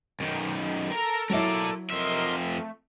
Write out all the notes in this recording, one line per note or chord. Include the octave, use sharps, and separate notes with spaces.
F#2 D#3
A4 A#4 A#5
F#3 E4 A#4 D5
F2 A#4 D#5 E5 C6
A3